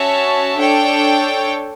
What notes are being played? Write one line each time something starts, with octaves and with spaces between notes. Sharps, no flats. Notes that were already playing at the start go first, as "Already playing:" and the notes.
Already playing: C#4 F#4 C#5 E5 A5
D4 A4 C#5 G5